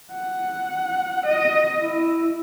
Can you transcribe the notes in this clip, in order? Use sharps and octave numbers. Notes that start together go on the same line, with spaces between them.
F#5
D#5
E4